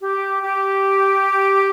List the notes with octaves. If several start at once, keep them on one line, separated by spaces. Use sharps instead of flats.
G4
G4